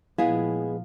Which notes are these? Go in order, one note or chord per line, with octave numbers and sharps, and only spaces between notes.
A#2 F3 G#3 B3 E4 G#4 F5